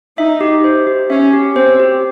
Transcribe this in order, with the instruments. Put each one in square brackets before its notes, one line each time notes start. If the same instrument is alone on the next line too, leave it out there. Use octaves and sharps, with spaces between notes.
[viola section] D#4 [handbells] E5
[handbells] G4
C5
G4
[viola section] C#4 [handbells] E5
[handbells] G4
[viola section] C4 [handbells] C5
[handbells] G4